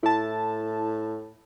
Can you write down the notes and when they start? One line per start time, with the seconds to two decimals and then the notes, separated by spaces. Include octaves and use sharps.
0.03 A2 E4 A5